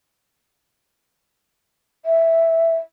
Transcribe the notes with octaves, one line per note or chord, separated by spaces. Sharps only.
E5